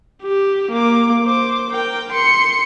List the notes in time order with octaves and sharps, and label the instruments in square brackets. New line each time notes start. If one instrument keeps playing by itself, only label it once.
[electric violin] G4
A#3 D6
C5 D6
A#4 G5
C6 C#7